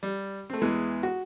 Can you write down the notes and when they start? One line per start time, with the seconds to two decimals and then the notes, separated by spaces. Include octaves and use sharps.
0.03 G3
0.50 A3 C4
0.62 E2 E3 G#3
1.03 F#4